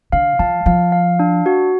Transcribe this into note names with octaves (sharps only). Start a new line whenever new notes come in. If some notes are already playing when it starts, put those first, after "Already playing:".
D3 F5
F3 A5
F3 F5
F5
D4
F#4